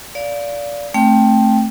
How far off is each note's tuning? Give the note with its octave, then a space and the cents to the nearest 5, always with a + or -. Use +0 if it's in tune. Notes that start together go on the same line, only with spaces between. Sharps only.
D5 -20 F5 +0
A3 +0 C4 +25 G5 +0